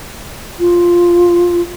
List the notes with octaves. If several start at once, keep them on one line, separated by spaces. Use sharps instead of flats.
F4